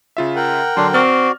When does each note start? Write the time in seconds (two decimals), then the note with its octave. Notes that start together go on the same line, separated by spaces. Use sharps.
0.17 C#3 F4 E5
0.36 A#4 F#5 G5
0.77 D3 F#3 D4 C6
0.94 C4 F#4 D5 F6